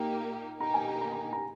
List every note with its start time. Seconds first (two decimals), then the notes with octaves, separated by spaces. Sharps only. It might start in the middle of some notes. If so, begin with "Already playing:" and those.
Already playing: A#2 A#3 D#4 G4
0.60 B2 A#3 D#4 G4 A#5
0.74 G#5
0.88 A#5
1.01 A#5
1.12 A#5
1.32 A#5